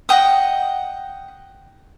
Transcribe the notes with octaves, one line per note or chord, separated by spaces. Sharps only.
D#5 F#5 G5 D#6